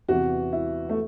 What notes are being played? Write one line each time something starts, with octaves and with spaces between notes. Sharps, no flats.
E2 C3 E3 F#4
E4
A3